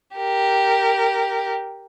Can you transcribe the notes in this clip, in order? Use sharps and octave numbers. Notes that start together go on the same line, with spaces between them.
G4 A#4